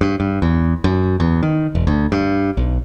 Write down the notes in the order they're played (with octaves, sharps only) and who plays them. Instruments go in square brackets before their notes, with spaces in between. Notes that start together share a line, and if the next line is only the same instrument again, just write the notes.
[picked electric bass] G2
G2
E2
F#2
E2
D#3
E1
D2
G2
B1